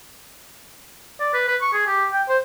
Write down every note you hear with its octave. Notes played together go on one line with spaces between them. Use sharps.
D5
B4
B4
C#6
G#4
G4
G5
C5